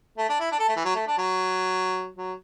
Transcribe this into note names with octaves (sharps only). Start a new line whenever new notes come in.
A3
D4
E4
D4
A4
A3
E3
F#3
A3
D4
F#3
F#3